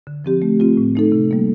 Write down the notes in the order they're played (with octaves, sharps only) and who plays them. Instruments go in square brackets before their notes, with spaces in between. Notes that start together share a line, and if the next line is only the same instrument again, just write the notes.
[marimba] D3
F3 C4 G4
A3
C4 F4
A2
A3 D#4 A4
C3
G3 A#3